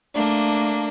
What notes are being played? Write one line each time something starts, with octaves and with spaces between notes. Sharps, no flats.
A3 A#3 D4